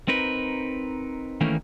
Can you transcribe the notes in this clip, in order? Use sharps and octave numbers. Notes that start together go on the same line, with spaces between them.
C4 D#4 A#4 B4
D#3 E3 A3 A#3 C#4 D#4